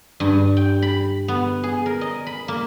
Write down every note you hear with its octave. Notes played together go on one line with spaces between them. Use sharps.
G2
G5
B5
B3
G#4
A#4
D#5
B5
A#3